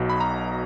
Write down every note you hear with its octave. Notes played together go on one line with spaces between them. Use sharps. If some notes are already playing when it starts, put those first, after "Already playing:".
Already playing: B1 B2
B5
A#5